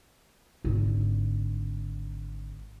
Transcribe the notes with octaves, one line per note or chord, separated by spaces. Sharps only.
G#1 D3